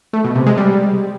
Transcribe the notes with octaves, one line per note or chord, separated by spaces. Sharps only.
A3
B2
C3
G#3
G3